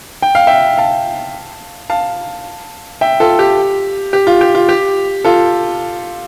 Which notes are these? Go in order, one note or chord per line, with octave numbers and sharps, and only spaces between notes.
G5
F5
E5 G5
F5 A5
F5 A5
E5 G5
F4 A4
G4
G4
F4
G4
F4
G4
F4 A4